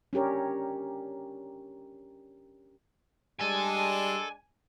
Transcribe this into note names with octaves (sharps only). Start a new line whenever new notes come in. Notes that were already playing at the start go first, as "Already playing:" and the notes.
C#4 D4 G4 A#4 C#5
G3 G#3 D4 A4 G#5